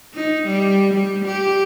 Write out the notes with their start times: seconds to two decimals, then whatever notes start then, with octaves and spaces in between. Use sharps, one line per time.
0.14 D#4
0.47 G3
0.94 G3
1.25 G4